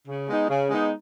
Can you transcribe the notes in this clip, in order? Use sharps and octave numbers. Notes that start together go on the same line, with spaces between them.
C#3
G#3 B3 D#4
C#3
G#3 B3 D#4